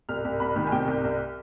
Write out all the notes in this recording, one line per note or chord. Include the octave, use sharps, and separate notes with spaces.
C2 F6
C2
C2 B5
D#3
G#5
C3 G5
C2
C2